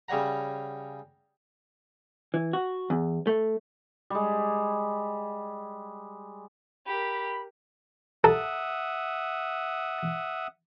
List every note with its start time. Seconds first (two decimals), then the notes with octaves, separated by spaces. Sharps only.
0.08 C#3 G3 C#5 F#5 A#5
2.34 E3
2.53 F#4
2.90 E2
3.27 A3
4.10 G3 G#3
6.86 G4 A#4 B5
8.24 A4 E5 F#5 D#6